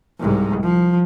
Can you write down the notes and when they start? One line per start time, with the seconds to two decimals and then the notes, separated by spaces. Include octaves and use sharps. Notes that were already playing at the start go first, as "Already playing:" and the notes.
0.19 C2 G#2
0.62 F3